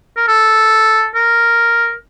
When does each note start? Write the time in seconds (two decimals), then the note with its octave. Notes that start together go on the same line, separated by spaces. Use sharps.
0.17 A#4
0.28 A4
1.15 A#4